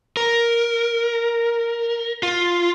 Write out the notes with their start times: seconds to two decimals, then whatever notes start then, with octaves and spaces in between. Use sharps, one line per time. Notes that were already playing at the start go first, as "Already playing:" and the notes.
0.17 A#4
2.23 F4